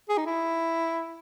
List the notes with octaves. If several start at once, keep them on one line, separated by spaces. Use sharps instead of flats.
G#4
D#4
E4